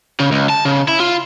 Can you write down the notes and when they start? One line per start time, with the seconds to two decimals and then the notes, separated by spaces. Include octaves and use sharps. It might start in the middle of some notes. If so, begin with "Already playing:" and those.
0.20 C#3
0.32 C#2
0.50 A5
0.65 C#3
0.88 E4
1.00 F4